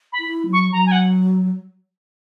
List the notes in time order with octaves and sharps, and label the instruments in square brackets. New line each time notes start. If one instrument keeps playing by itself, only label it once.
[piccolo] B5
[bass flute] E4
F#3
[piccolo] C#6
[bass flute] F#3 [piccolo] A#5
[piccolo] G#5
F#5